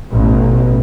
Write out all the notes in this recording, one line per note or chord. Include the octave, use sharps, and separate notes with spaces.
A1 B2